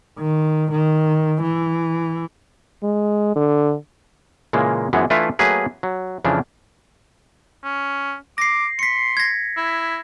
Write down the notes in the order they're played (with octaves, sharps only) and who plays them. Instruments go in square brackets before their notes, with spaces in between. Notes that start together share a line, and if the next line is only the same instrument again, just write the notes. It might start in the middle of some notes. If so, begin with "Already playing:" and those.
[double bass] D#3
D#3
E3
[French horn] G#3
D3
[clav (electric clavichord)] A#2 C#3 E3 G#3 A#3
F#2 E3 F3 G#3 B3
E3 A3 D4 E4 F4 B4
F#3 A3 A#3 G#4 B4
F#3
F2 C#3 E3 F3 D4
[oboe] C#4
[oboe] D6 [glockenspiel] A#6 C7
[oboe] C6 [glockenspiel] B6 C#7
[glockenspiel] G#6 A#6
[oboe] E4